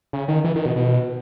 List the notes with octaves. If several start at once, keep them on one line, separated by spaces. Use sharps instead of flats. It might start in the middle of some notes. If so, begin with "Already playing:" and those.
C#3
D#3
E3
D#3
B2
B2